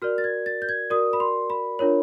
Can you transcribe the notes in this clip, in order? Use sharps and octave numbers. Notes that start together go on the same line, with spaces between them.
F#4 A#4 D5 F6
A6
G#6
A6
G6
G#6
F#4 A#4 D5 D#6
B5
C6
B5
D4 F4 A#4 C#5